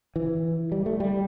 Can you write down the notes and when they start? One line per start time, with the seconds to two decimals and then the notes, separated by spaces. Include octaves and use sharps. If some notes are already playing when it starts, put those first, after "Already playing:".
0.16 E3
0.72 G3
0.86 A3
1.00 G3